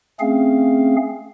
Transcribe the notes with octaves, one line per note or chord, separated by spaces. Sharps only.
A3 C4 C#4 G#4 F5